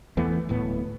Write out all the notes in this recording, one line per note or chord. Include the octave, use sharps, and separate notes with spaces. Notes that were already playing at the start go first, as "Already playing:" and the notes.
E2 E3 A3 B3
D1 A2 B3